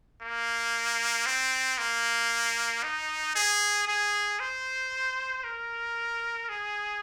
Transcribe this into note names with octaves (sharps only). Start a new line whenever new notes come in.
A#3
C4
A#3
D#4
G#4
G#4
C5
A#4
G#4